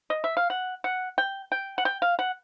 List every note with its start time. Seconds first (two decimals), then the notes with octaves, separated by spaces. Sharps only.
0.10 D#5
0.24 E5
0.37 F5
0.50 F#5
0.84 F#5
1.18 G5
1.52 G5
1.78 F#5
1.85 G5
2.02 F5
2.19 F#5